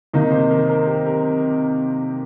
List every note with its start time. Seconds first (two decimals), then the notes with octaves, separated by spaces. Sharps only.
0.14 C3 D#3 A#3 D#4
0.31 C5
0.50 A#4
0.69 A#4
0.87 G4
1.06 A#4